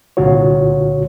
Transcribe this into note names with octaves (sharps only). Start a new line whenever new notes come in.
C2 A#2 D3 F4 F#4 C#5